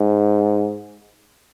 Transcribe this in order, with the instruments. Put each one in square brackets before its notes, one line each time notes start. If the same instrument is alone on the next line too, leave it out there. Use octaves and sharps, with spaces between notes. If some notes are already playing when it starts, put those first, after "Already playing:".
Already playing: [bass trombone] G#2